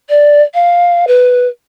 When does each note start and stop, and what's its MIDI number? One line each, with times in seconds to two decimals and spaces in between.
0.09 0.42 74
0.54 1.05 77
1.07 1.48 71